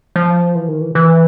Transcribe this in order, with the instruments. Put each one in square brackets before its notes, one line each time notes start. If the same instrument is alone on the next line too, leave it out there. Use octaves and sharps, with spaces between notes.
[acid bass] F3
E3
D#3
E3
E3